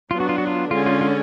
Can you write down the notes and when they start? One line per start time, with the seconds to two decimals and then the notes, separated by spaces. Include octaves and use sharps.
0.11 F#3 B3 D4 F4
0.20 F#4
0.29 F4
0.38 F#4
0.47 F4
0.71 D3 G#3 C#4 F4
0.86 F4
1.01 F4